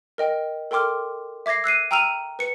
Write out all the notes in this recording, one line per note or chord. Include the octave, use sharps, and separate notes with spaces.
A#4 D#5 G5
A4 A#4 G5 C6 D6 F6
E5 D6 G#6 A#6 C7
E6 F#6 C7 D#7
G5 A#5 E6 F6 D#7 F7
B4 C#7